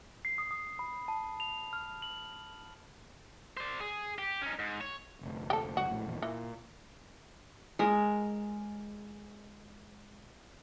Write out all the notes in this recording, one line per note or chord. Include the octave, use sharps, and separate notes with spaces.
C7
D#6
D#6
B5
A5
F7
F6
F#7
C5 D5
G#4
G4
C#4 D#4
G#2
C#5
F1 D2
G4 A4
C#2 G2 F#4
A#1 A2
A#1 E2 A#2
A#2 E3
G#3 A#4